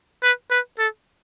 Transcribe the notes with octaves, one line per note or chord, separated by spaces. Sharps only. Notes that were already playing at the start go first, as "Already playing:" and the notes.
B4
B4
A4